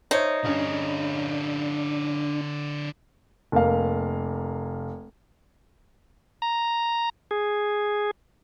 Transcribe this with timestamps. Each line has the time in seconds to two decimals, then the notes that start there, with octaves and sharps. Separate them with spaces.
0.11 D#4 C5 C#5 E5
0.45 G2 D3 C#4 D4 C#5
3.52 F1 A#3 F5
6.42 A#5
7.31 G#4